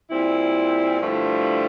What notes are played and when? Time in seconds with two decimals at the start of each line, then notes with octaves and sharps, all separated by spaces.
0.10 A#2 G3 C4 E4
1.01 G2 D3 F3 A3 E4